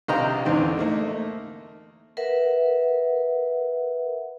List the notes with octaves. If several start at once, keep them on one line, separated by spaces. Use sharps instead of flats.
A#1 C3 D#5 F5 G5 A#5
A1 E2 G#2 D3 D#3 C4
A3 A#3 D#4
A#4 B4 E5 F#5